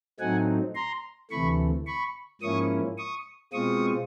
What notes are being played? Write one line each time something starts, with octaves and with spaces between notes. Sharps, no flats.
A2 F#3 A3 C4 D#4 F#5 G#5
A#5 C6
D2 C3 E3 A3 B5 C#6
B5 C#6
G#2 F3 A#3 C#4 E4 C#6 D#6
C#6 D#6
B2 G#3 C4 F4 C#6 D#6